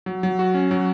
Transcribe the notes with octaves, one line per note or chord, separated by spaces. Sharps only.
F#3
F#3
F#4
C#4
F#3